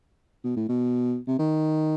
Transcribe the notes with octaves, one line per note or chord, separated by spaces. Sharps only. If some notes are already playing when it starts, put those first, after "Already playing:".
B2
A2
B2
C3
D#3